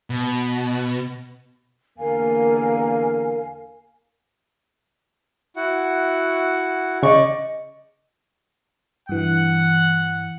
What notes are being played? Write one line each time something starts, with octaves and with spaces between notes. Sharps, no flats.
B2
E2 D3 A#3 A#4 F5 G#5
E4 F#4 F#5
C#3 D5 D#5 C#6
G2 E3 F#5